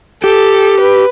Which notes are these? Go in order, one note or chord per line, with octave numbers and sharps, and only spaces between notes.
G4 A4
B4